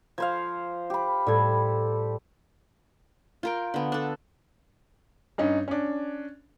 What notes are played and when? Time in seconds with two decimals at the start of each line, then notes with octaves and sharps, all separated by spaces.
0.18 F3 C5 F5 G#6
0.90 G4 B5
1.26 A2 G3 A4 G#6
3.43 F4 A#4 G5
3.74 D3 B3
3.92 D4 A4
5.38 G2 C#4 D#4
5.68 C#4 D4